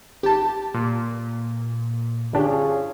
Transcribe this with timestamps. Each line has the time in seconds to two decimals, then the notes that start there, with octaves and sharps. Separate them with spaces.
0.23 G#1 G4 A5
0.74 A#2
2.33 G1 C#4 D4 F4 G4 G#4